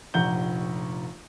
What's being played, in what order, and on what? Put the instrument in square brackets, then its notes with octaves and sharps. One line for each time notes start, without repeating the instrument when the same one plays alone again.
[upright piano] F1 A#1 F#5 A#5 G6 G7